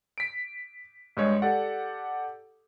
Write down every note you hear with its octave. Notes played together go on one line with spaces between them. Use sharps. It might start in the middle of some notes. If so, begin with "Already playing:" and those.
B6 D7
G2 G#3 C#5 D#5
G4 A4 D5 F#5